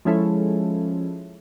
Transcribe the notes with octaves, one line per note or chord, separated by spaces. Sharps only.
F3 G#3 C#4 E4 A4